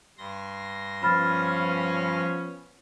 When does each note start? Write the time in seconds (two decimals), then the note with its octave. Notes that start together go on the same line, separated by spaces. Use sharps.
0.18 G2 C6 A#6
1.03 F3 B3 C#4 B5 F6 A6